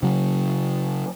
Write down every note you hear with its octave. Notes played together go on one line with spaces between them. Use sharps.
C#3 F#3